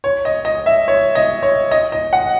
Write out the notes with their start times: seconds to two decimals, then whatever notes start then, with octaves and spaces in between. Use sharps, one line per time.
0.04 C#5
0.25 D#5
0.45 D#5
0.66 E5
0.88 C#5
1.15 D#5
1.43 C#5
1.71 D#5
1.92 D#5
2.13 F#5